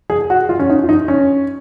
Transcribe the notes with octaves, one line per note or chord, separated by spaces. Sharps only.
G#4
F#4
F4
C#4
D#4
F4
D#4
C#4